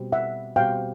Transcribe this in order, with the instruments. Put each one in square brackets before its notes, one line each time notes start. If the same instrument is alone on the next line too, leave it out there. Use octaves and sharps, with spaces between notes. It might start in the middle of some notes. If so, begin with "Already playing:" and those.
Already playing: [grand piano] B2 G3 C4
[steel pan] E5 F#5
[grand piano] B2 G3 C4 [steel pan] F5 G5